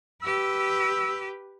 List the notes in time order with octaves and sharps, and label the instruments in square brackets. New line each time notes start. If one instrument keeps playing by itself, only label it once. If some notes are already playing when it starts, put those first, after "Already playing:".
[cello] G4 B4 [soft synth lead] E6